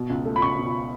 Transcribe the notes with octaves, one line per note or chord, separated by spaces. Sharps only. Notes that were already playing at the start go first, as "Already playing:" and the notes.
Already playing: B2
C#2
A3
B5
C#2 C#6
B2